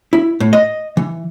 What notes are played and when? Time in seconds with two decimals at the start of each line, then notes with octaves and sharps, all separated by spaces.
0.13 E4
0.40 A2
0.53 D#5
0.97 E3